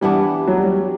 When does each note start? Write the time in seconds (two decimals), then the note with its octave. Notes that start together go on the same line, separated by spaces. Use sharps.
0.01 E3 G3 B3 D4
0.48 F#3
0.57 G3